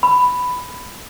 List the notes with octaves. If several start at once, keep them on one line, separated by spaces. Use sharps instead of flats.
B5